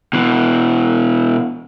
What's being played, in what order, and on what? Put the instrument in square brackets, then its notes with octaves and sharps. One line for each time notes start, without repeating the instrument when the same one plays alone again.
[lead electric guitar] B2 E3